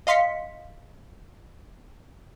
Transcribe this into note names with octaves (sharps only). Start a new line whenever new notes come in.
D#5 F5 C6 B6 C#7